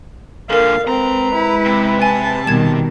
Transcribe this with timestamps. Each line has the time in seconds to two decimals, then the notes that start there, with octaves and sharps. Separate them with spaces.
0.50 A#2 D3 A4 A#4 F5
0.87 G#3 C4 B4 A#5
1.35 E4
1.65 C3
2.02 G#5 A5
2.47 B2 D#3 G3 G#6 E7